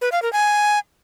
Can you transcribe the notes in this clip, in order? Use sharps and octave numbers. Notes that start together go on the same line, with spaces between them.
B4
F5
A#4
G#5